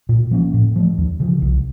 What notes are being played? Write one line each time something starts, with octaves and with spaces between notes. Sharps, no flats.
A#2
F3 A#3 C#4
A2
F3 A3
D#2
C#3 F3
C2